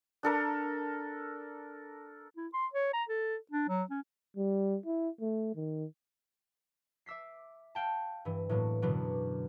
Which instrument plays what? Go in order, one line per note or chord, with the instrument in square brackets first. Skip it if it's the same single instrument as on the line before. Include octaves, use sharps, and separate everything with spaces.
[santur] D4 A4 A#4
[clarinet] E4
C6
C#5
A#5
A4
D4
F#3
C#4
[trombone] G3
E4
A3
D#3
[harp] E5 D6 E6 B6 C7
F5 G5 A5
G2 E3
A2 E3 F#3 A#3 B3
F#2 B2 D3 F#3 B3 D4